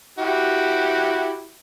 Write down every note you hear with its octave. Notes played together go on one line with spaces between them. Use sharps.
E4 F#4 G4